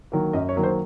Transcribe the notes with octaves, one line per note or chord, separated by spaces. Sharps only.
D#3 F#3 A#3
F#2 D#5
C#5
D#3 F#3 A#3
C5